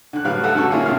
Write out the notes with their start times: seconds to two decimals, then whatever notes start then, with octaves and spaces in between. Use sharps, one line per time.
0.13 D3 F#6
0.24 A2 F#3 G3 B4 F5 F#6
0.43 A3 F#4 G4 A4 F5 F#5
0.55 F#2 D3 F#3 A4 C#6
0.71 A#3 C#4 E4 F4 G#4
0.86 B1 G2 B2 E4 F5 F6